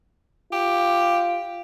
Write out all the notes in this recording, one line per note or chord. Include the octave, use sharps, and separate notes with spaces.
F4 G4